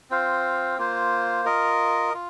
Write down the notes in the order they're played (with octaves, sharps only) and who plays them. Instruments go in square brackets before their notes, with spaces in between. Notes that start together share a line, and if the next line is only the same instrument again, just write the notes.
[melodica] C4 F4 C5 F5
A#3 F4 C5
F4 A#4 D#5
F4